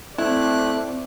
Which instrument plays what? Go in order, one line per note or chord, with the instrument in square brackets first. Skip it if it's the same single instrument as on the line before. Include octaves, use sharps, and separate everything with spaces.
[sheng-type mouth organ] A3 F#6 [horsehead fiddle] C4 D5 [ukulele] E4